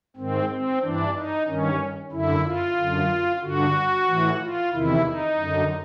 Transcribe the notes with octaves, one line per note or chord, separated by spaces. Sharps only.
G#2 D#3 C4
C4
G2 E3 D4
D#4
G2 D#3 C#4
F#2 D3 E4
F4
F#2 D3
G2 D3 F#4
A2 E3
F4
E2 C3 D#3 E4
D#4
F#2 D3